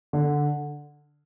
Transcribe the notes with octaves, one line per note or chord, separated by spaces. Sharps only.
D3